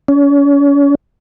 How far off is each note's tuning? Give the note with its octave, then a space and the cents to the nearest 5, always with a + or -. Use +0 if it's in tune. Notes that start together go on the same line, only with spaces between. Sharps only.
C#4 +35